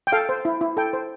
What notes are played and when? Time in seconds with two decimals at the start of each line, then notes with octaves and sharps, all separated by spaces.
0.07 G5
0.12 A4 F5
0.29 C5
0.45 E4
0.61 E4
0.77 A4 G5
0.93 C5